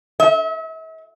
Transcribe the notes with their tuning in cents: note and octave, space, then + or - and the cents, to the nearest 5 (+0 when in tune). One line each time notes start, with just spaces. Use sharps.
E5 -40